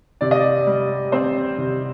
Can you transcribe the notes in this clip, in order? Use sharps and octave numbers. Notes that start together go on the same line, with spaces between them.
C3 D5
D#5
D5
G3
C4 C5
C3